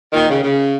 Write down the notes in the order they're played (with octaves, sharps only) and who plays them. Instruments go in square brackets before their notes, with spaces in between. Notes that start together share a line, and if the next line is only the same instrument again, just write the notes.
[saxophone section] A#2 D#3
C#3
C#3